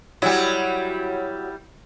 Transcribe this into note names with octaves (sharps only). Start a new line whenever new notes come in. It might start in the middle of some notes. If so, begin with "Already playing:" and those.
F#3 G3 E4